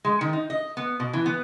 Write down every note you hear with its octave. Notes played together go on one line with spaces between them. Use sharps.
G#3
D#3
D#4
D#5
B3
B2
E3
B3